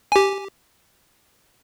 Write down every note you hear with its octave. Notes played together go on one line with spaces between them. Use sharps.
G4 G#5